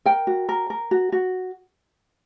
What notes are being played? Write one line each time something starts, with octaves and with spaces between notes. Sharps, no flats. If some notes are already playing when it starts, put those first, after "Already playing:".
A#4 G5
F#4
A#4
A#4
F#4
F#4